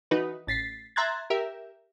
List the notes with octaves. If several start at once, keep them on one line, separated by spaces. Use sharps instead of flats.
E3 D#4 F#4 B4
A1 A6 B6 C7
E5 A#5 C6 F#6 G#6 A6
G4 A#4 E5